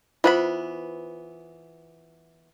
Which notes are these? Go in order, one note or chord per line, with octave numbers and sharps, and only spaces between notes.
E3 B3 F4 C5 B5